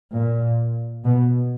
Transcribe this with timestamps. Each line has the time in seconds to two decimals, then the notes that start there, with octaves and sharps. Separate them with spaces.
0.14 A#2
1.04 B2